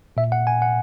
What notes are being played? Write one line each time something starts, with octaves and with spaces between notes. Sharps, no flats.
A#2 E5
F#5
G#5
F#5